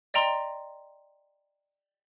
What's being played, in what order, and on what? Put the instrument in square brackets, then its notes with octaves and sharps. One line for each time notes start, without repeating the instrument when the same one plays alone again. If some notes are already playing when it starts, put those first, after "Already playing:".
[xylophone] D5 D#5 G5 A#5 C6